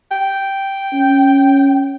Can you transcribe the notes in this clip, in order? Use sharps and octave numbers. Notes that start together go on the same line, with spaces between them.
G5
C#4